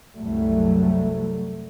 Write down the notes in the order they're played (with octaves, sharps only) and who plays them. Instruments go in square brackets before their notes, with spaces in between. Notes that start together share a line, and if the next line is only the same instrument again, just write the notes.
[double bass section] C2 F#2 F#3 G3 A3